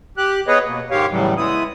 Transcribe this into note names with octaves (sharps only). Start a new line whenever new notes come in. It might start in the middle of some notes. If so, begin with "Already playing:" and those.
G4 F#6
B3 G#4 B4 C#5 D#5
B2 A#3
G#2 D#3 G#3 G4 C#5 F5
A2 C#3 E3 F#3 G3
G#3 B3 E4 D#6